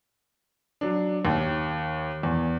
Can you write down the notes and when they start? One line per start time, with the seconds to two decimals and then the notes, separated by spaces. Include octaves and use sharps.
0.81 F#3 D4
1.25 D#2
2.23 E2